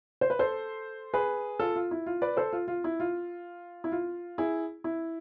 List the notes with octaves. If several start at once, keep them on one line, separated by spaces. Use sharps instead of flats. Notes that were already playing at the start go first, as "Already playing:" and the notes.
C5
B4
A4 C5
G#4 B4
F4 A4
F4
E4
F4
B4 D5
A4 C5
F4
F4
E4
F4
E4
F4
E4 G#4
E4